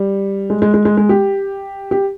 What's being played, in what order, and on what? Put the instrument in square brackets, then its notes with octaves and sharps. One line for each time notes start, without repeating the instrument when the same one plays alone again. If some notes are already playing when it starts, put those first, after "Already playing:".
Already playing: [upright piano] G3
G#3
G#3
G#3
G#3
G#3
G4
G4